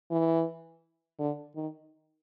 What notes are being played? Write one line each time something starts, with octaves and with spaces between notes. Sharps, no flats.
E3
D3
D#3